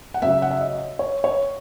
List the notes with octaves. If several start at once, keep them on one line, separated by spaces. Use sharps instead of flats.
F#5
F#2 C#3 F#3 E5
F#5
E5
D#5
C#5
C#5